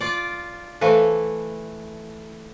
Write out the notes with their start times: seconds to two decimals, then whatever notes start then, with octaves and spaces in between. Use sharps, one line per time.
0.01 F4 D5
0.81 E3 A3 A4 C5 F5